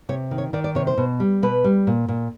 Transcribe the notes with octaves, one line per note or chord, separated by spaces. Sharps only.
C3 C#5
D#3
C#5
D#3 D5
D5
C3 C#5
C5
B2
G3
B2 B4
G3
A#2
A#2